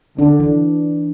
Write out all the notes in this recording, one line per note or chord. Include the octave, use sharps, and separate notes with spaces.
D3 D4
E3